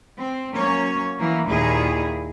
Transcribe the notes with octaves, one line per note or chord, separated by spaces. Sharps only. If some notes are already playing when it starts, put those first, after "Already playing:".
C4
F#3 A#3 C#4 C#5
E3 F#3 A#3
D#2 A#2 D#3 E4 G#4